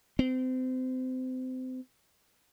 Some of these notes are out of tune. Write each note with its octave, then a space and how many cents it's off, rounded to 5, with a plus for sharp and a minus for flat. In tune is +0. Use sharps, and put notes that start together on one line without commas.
C4 -30